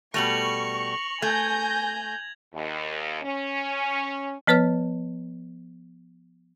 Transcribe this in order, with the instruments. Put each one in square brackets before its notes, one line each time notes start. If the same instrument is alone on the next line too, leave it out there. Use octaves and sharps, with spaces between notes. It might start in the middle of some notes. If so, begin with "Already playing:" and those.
[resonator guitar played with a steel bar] B2 G3 A3 [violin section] C#6 [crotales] A#6 F7 F#7
[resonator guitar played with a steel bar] A3 [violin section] G#5 G6 A#6 [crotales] G#6
[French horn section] D#2
C#4
[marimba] F3 B3 B4 C#5 F6